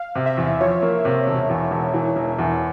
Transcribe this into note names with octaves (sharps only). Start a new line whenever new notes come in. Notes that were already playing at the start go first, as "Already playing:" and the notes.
Already playing: F5
C3
E5
E2
F3 C#5
A#3
C3
E1
E2
E1
E3
E1
E2